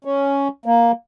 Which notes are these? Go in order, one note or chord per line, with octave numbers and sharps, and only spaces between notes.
C#4
A#3